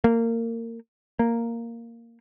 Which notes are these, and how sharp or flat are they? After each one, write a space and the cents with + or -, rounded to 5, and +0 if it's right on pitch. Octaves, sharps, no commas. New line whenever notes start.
A#3 -25
A#3 -5